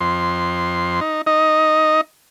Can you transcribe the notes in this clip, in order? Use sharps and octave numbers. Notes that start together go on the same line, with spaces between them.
F2 C6
D#4
D#4 D#5